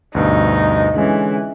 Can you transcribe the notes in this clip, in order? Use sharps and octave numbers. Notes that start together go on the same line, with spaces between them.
D2 G2 B2 D#4
D3 E3 G#3 C#4